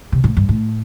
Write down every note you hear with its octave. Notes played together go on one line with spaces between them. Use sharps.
C3
A2
G2
A2